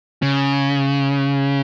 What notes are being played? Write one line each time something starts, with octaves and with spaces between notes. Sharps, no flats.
C#3